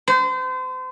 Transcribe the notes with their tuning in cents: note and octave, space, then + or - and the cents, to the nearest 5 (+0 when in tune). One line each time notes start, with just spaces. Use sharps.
C5 -35